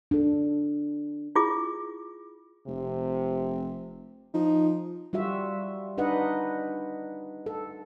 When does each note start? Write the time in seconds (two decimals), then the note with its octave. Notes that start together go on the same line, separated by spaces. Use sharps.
0.11 D4 A4
1.36 E4 F4 G#4 D6
2.67 F1 C3
4.34 F3 D#4
5.13 G3 F4 F#4 E5
5.98 D4 D#4 B4 D#5 F#5
7.46 A4